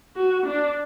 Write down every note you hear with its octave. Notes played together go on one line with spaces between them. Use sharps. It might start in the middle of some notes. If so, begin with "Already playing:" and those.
F#4
D4